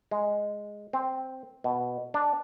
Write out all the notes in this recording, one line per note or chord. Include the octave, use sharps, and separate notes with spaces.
G#3
C4
B2
D4